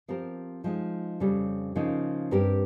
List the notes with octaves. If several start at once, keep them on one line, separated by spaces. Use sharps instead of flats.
F3 C4 G4 A#4
F3 G#3 D#4
F2 C#3 G3
C#3 F3 A#3 D#4
G2 G3 C4 G4 A#4